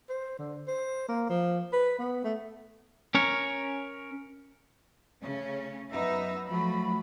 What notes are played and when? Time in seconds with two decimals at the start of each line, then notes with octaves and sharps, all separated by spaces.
0.10 C5
0.39 D3
0.68 C5
1.09 A#3
1.30 F3
1.73 B4
1.99 B3
2.24 A3
3.15 C#4 A#4 C#5
5.23 C#3 A3 C#4
5.92 F#2 B3 D#4 E5
6.48 F3 F#3 A3 F#4 B5